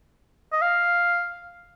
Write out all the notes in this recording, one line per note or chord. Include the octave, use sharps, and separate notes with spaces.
D#5
F5